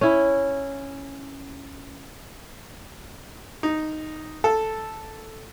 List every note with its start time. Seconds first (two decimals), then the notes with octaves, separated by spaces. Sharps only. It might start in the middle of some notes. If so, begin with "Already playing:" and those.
0.01 C#4 E4
3.63 D#4
4.44 A4